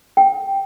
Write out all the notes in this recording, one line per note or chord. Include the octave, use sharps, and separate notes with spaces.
G5